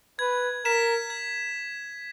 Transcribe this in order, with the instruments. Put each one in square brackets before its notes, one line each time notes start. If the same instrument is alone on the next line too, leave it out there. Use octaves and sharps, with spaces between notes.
[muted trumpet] B4 [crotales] G#6
[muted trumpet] A#4 [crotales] B6 E7
[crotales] G#6